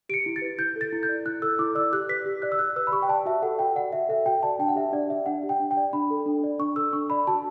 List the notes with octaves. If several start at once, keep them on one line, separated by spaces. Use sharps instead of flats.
G4 C#7 D7
E4
A6
B4
E4 G6
A4 A6
E4
G6
D5
E4 F#6
A4 E6
E4 D6
D5 E6
G4 F#6
B4 B6
G4
D5 F#6
E6
G4 F#6
B4 E6
B5
G4 C#6
G5
D5 A5
F#4 E5
A4 F#5
F#4 G5
D5 F#5
F#4 E5
A4 E5
F#4 G5
D5 A5
D4 G5
F#5
G4 E5
D4 D5
D5 E5
D4 F#5
G4
G5
D4
G5
D5
D4 B5
A4
D4
D5
D4 C#6
A4 E6
D4 C#6
D5 B5
F#4 A5